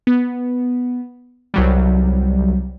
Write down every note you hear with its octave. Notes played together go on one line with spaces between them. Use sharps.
B3
C2 F#3 G3